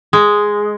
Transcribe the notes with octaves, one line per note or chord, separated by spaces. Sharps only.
G#3